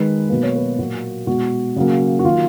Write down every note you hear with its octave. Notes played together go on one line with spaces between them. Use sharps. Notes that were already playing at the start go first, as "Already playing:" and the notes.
Already playing: D#3 G#3 B4
B2 F#3 A#3 B4
C#5
B4
A#2 F#3 A#3 F#4
B2 G#3 F#4
C#3 F#3 A#3
F#4
D#3 F#3 A#3 F4